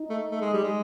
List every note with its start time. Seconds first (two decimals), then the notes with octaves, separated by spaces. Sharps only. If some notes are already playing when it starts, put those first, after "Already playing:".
Already playing: D#4
0.10 A3
0.31 A3
0.41 G#3
0.54 G3
0.64 G#3